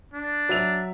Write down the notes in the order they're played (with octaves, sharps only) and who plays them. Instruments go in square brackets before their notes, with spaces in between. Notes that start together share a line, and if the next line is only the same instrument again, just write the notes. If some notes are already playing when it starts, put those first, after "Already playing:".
[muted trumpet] D4
[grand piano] F#3 E5 F7